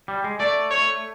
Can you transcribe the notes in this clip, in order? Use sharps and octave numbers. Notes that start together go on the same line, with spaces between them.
G3
G#3
A3 D5
C#5